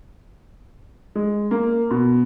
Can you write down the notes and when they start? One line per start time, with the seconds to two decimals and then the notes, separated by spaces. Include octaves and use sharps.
1.15 G#3
1.51 A#3
1.90 B2